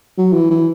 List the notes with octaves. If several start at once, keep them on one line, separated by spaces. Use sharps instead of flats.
F#3
E3
E3